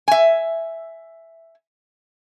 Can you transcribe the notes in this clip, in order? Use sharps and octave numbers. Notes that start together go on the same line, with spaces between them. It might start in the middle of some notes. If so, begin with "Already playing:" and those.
E5 G#5